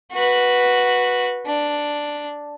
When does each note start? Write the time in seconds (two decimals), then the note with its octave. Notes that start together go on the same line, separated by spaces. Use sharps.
0.12 F#4 B4
1.46 D4